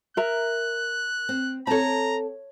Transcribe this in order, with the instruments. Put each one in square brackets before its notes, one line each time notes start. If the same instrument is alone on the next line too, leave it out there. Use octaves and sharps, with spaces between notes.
[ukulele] A#4 E5 A#5 [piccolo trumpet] F#6
[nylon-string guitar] C4
[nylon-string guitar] C4 A4 [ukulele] C#5 A5 [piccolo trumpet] A#5